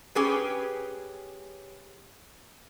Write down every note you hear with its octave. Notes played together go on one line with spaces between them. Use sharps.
C#4 G4 G#4 B4